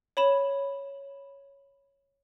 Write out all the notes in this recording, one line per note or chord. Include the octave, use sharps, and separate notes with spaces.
C#5 B5 E7